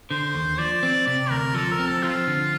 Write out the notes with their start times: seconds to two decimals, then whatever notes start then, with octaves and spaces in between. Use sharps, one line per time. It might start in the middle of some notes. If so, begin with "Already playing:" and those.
0.11 D3 C5
0.35 D#2
0.58 F3 D5
0.83 C4
1.07 C3 D5
1.30 D2 A#4
1.55 F3 A4
1.72 A#4
1.79 C4
1.87 A4
2.03 F3 F4
2.27 D3